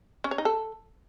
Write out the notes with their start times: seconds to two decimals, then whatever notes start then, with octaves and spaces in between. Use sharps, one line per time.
0.24 C#4
0.31 C#5
0.38 D#4
0.45 A4